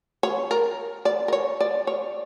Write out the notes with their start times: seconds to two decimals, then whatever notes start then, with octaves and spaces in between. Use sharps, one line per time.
0.23 C#5
0.51 A#4
1.05 D5
1.28 A#4
1.33 C#5
1.60 D5
1.87 C#5